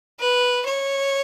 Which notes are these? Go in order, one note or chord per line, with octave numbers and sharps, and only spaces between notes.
B4
C#5